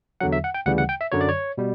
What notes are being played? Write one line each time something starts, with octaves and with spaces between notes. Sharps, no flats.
E2 D3 F#3 F#5
E5
F#5
G5
D2 C#3 E3 G3 F#5
F#5
G5
E5
F#2 D3 F#3 C#5
D5
C#5
B2 G3